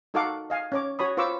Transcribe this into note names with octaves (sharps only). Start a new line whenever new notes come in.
D#4 F#4 A4 F5 F#5 D6
D#5 F5 G#5
C#4 C#5 D6
F#4 C#5 B5 D#6
F4 B4 C5 C#6 D6 E6